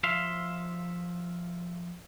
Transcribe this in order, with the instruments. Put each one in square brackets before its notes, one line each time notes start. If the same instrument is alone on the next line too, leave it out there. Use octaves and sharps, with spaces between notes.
[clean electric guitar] F3 E5 F5 C6